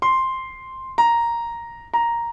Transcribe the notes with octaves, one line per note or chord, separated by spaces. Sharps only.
C6
A#5
A#5